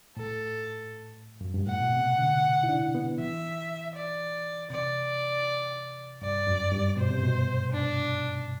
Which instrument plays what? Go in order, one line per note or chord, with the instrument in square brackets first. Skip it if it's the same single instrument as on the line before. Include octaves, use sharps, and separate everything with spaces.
[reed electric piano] A2 [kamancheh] A4
[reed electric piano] F#2
G2
[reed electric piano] A2 [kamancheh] F#5
[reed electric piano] B2
C3
D3
E4
D4
B3
[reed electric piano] E3 [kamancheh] E5
[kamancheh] D5
[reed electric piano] C3 [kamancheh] D5
[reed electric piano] G2 [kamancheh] D5
[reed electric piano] F#2
G2
[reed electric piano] B2 [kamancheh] C5
[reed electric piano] C3
B2
[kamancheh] D4